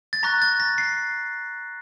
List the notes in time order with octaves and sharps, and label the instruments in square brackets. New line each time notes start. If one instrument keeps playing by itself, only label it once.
[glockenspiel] A6
A#5 C#6 F#6 A#6
A6
A#6
C7